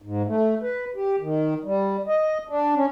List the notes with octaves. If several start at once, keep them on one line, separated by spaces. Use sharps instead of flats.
G#2
A3
B4
G4
D#3
G3
D#5
D4
C#4